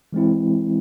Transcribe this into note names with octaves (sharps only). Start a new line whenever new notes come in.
E3 G#3 C4 E4